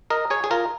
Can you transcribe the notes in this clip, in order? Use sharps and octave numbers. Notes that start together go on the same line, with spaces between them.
A#4 D#5
G#4 C#5
G#4
F4 A#4